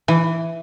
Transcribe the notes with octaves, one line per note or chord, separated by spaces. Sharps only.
E3